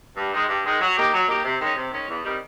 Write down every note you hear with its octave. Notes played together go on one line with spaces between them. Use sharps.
G2
D#3 G#3
G2
D#3 G#3
F#3
A#3 D#4 G4
F#3
A#3 D#4 G4
C3
D#3 G#3 C#4
C3
D#3 G#3 C#4
E2
C3 D#3 G3